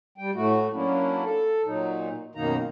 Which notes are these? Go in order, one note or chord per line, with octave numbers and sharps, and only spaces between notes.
G3 G5
A2 A3 F#4
F#3 A#3 C#4 D4 E4
A4
A#2 F#3 D#4
F#2 B2 D#3 A#3 D#4 A#5